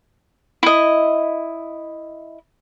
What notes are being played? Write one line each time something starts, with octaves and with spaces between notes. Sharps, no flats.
E4 D#5